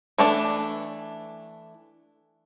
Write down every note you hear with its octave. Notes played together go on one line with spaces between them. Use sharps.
E3 A3 D4